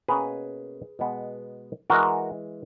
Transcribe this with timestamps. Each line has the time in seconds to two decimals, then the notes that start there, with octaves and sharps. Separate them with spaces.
0.08 B2 A#3 C#4 G#4 B4
0.99 B2 G#3 B3
1.90 E3 G#3 F#4 A#4